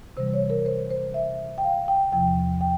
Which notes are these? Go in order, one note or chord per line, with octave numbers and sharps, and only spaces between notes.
C3 E3 G3 C5
C#5
A#4
C5
C5
E5
G5
F5
G5
E2 C3 F3 G5
G5